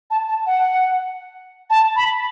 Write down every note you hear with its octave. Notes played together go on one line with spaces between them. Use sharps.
A5
A5
F#5
A5
B5